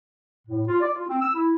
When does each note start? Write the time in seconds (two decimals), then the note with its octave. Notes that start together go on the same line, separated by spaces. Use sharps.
0.48 A2
0.68 F4
0.81 D5
0.94 F4
1.09 C4
1.22 E6
1.34 E4